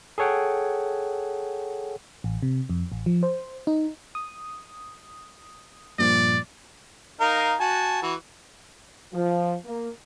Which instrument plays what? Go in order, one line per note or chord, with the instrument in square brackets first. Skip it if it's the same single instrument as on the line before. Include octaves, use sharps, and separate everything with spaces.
[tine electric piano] G#4 A4 C#5 F#5 G5
[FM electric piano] A1
C3
F2
A1
F3
C5
D#4
D#6
[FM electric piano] G2 A#2 F3 [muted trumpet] D5
[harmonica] D#4 A#4 F5
F#4 G#5 A5
E3 F#4
[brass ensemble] F3
A#3